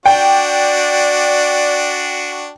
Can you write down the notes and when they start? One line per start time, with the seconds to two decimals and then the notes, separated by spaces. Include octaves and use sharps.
0.06 D4 F#4 D5 G5